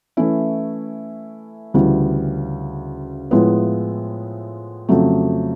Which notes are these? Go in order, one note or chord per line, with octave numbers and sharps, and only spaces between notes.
E3 A3 C#4 E4
D2 C#3 E3 G3
A2 F3 G#3 B3 E4
F2 C#3 F#3 A3